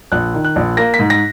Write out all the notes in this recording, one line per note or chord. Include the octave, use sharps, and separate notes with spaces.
A#1 F#6
D#3
F#6
A#1
A#3 A#6
B6
G#2
A#6